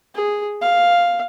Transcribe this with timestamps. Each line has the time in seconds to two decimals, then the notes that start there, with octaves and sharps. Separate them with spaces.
0.15 G#4
0.61 F5